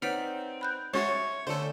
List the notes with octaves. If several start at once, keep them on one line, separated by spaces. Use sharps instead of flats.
C4 D#4 B4 C#5 D5 F#5 F6 B6
B5 F#6 G6
G#3 C#4 F#4 C#5 E5 A5 C6 C#6
D3 A3 C#4 A4 C5